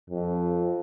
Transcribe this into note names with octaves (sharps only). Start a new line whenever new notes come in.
F2